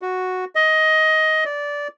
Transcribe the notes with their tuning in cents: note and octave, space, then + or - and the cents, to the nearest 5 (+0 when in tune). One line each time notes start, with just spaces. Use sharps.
F#4 -5
D#5 +15
D5 -15